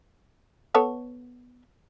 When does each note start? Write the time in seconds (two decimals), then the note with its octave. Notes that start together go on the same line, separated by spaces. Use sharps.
0.75 B3 A4 C#5